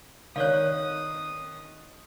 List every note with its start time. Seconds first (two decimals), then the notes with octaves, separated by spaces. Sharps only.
0.36 D#3 C#5 D5 F5 D#6 F#6